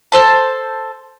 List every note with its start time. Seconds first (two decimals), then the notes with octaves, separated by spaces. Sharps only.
0.12 A4 C5 A5